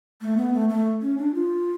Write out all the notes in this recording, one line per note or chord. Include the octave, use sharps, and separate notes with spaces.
A3
B3
A3
A3
C#4
D4
F4